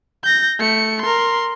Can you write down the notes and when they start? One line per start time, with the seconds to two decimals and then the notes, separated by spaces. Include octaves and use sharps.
0.23 G6 A#6
0.59 A3 C#7
1.02 A#4 C6